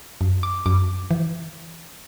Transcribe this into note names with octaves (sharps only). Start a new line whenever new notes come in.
F#2
D6
F#2 D6
E3